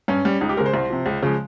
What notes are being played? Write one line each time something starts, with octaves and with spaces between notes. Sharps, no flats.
G2 C#4
G3
C#2 D#4
G4
C#3 G#3 A#4
C5
C2
C3 F3
C#2
C#3 F3 G#3